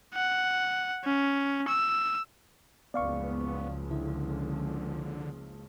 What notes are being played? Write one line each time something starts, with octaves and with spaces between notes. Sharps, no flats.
F#5
C#4
E6
F#1 C#2 F3 B3 D5 F5 C#6
D3 E4